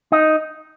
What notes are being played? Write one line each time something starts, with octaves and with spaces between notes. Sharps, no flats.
D#4